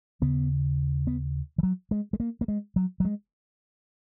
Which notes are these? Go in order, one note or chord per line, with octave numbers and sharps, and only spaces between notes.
D#2 C#3 B3
B3
E3
F#3
G#3
G#3
A#3
A#3
G#3
F#3
F#3
G#3